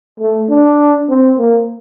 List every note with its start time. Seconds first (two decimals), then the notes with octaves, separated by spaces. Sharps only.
0.20 A3
0.50 D4
1.09 C4
1.38 A#3